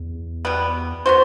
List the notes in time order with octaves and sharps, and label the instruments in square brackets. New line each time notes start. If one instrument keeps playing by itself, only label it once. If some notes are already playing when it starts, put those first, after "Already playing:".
Already playing: [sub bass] E2
[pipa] B2 G3 B3
B3 F#4 C5